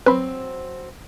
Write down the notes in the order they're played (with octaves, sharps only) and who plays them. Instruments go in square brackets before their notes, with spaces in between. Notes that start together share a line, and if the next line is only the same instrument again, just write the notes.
[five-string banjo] F#3 C4 [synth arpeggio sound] B4 B5